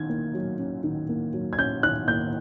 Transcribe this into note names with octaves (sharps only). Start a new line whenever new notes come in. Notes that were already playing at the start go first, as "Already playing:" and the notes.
Already playing: D#3 C#4 G#6
A#3
F#3
C#4
D#3
A#3
F#3
G#6
C#4 G6
D#3 F#6
A#3 G6